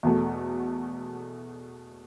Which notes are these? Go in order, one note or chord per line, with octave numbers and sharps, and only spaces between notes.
E2 B2 A3